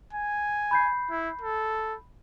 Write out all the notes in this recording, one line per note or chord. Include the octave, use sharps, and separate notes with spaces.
G#5
B5 G6 C7
E4
A4